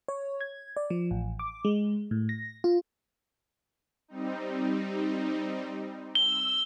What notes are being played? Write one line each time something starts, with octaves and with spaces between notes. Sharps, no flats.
C#5
G#6
D5
F3
A1
D6
G#3
A2
A#6
F4
G3 C4 D#4
E6 G7